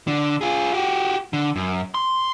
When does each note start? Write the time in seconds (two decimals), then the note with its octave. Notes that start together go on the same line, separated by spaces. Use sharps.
0.07 D3
0.41 F4 G#4
0.74 F#4 G4
1.33 D3
1.56 F#2
1.94 C6